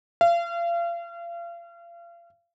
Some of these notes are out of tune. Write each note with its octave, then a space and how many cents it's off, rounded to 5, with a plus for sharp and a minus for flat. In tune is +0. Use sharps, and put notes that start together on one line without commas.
F5 -35